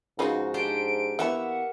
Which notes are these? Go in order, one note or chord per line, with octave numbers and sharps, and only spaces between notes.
G#2 C#3 F3 D#4 F#4 B4
D4 G4 C5 D7
E3 A#3 B3 E5 F#5 C#6